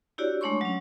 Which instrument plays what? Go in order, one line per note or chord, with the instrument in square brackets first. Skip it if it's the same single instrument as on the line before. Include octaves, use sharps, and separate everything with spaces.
[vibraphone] D4 E4 F#4 G4 C#5 D5
G#3 A3 D4 C#5 C6 C#6
F#3 C#4